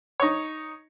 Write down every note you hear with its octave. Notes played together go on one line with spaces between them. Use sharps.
D#4 C#5